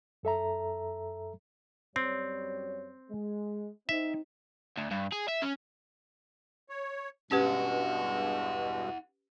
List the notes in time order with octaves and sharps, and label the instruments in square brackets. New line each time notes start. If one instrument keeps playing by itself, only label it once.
[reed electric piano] F#2 A4 E5 A#5
[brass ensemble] F#2 G3 C#5 [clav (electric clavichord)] C4
[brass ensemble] G#3
[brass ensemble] C4 D#4 [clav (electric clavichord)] E5
[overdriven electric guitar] D2
G2
G#4
E5
C#4
[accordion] C#5
[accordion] G2 B2 G#3 [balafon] C#4 G4 B4 [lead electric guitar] E4 F#5